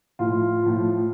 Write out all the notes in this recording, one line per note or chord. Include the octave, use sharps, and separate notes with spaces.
A2 F3 F4
A2 F3